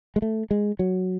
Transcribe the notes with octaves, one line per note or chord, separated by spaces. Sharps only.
G#3
A3
G#3
F#3